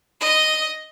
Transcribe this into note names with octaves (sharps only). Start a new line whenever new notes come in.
D#5